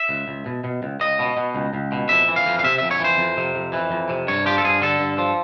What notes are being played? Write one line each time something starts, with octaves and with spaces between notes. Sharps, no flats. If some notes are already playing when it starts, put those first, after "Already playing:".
Already playing: E5
C#2
C#2
B2
B2
C#2
C#2 D#5
B2
B2
C#2
C#2
B2
F2 E5
E3
F5
F2
F5
C3 E5
F2 E5
C#5
E3 C5
F2
C3
F2
E3
F2
C3
G2 C#5
F3 G4
A4
G2 G#4
D3 A4
G2
F3